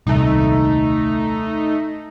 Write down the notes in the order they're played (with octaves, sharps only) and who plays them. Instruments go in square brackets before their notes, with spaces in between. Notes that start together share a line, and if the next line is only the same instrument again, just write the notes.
[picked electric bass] D#1 C2 [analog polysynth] A3 D#4